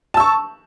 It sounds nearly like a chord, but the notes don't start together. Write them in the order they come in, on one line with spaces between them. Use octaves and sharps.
A5 E6 C#6